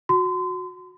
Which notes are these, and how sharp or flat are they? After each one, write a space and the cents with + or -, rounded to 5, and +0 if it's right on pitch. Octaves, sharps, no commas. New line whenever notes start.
F#4 -20 C6 -30